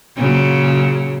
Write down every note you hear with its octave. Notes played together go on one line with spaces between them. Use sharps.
A#2 C#3 F#3